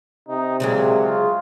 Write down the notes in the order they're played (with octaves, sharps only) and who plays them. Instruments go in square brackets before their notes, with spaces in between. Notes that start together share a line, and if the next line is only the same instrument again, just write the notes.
[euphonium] C3 [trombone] D#4
[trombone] A#2 [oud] C#3 F#3 G#3
[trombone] F4